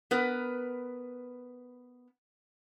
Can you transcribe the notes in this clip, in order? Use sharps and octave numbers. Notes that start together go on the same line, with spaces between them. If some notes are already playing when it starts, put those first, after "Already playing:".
B3 A#4 B4